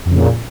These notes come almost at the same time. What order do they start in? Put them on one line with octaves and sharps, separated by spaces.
F2 C#3 A#2